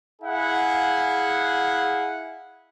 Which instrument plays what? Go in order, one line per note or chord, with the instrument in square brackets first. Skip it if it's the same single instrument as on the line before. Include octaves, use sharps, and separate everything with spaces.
[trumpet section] E4 G#4 F5 F#5